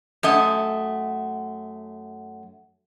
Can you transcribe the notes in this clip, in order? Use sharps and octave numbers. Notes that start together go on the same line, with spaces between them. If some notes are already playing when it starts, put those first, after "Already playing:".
F#2 A3 D#5